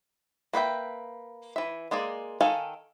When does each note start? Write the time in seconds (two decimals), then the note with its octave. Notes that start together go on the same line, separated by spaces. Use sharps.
0.53 A#3 B4 E5 G5
1.56 E3 E5
1.91 G#3 A#3 G#4 D5
2.41 D#3 A4 F5 G#5